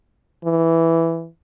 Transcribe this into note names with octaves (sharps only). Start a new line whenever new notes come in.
E3